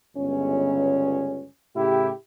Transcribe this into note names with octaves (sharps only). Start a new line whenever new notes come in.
G1 C#2 C#4
A2 C#3 E4 G4